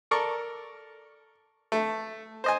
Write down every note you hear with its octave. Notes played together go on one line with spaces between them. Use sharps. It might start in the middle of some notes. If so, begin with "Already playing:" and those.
A4 A#4 D5 C#6
A3
C5 D#5 G#5